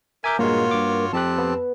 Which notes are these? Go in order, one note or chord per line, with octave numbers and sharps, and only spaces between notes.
A#4 E5 G#5 D6 G6
G2 A#2 G#3 A#3 F4 F#4 C#5
G2 D6
F2 C4 G4 A5 F#6
B3